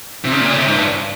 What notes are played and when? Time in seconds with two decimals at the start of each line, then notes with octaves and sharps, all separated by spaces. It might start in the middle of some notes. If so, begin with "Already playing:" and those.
0.25 C3
0.32 C#3
0.40 A#2
0.50 C#3
0.58 C3
0.66 G#2
0.74 G2